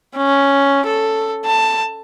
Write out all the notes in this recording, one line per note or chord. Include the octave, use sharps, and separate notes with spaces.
C#4
A4
A5